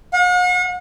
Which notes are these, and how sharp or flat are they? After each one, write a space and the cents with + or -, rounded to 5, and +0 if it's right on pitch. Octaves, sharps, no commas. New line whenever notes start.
F#5 -45